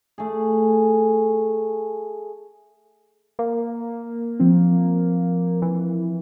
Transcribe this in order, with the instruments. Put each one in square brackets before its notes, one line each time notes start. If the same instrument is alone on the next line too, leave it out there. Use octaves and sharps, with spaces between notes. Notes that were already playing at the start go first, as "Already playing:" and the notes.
[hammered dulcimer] A3 G#4
[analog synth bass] A#3
[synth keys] F3 C4
[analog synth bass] E3